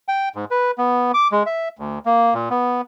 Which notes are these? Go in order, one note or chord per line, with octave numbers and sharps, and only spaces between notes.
G5
G#2
B4
B3
D6
G#3
E5
D2
A#3
A#2
B3